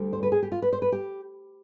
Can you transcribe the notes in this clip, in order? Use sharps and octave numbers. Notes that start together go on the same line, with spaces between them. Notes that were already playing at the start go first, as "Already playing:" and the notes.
Already playing: D2 D3 G3
C5
B4
G#4
G4
F4
B4
C5
B4
G4